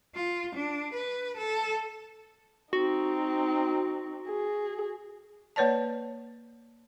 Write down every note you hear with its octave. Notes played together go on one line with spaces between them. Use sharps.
F4
D4
B4
A4
C4 D#4 F#4
G#4
A#3 B4 C#5 D5 A5